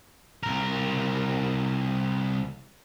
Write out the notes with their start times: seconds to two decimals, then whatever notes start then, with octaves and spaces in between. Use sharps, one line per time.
0.43 C2 A#4